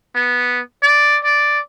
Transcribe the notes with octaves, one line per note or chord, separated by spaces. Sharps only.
B3
D5
D5